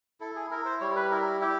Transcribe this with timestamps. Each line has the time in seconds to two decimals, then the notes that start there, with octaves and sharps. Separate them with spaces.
0.20 E4 A4
0.36 G#4
0.51 E4 A#4
0.66 C5
0.80 G3 C#5
0.96 B4
1.11 E4 A#4
1.41 E4 G4